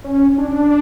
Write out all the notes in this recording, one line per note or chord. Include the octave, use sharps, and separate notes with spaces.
C#4
D4